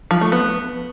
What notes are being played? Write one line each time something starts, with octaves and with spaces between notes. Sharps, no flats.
F3
A3
B3